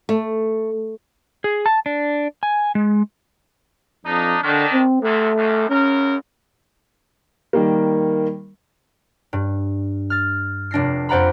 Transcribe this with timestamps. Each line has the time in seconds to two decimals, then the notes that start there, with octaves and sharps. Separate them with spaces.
0.09 A3
1.44 G#4
1.66 A5
1.86 D4
2.43 G#5
2.75 G#3
4.05 F2 D4 D#4
4.43 D3 D#3 D4
4.73 C4
5.03 E2 C3 A3
5.35 C#2 F#2
5.70 F#2 C#3 C#4 A#4
7.53 D#3 G3 A#3
9.33 G2
10.10 F6 A6
10.71 F1 D4 A#6 C7
11.09 F2 C5 D5 F#5 A#5 B5